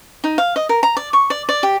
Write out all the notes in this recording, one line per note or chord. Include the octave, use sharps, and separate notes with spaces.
D#4
F5
D#5
A#4
A#5
D5
C#6
D5
D5
G4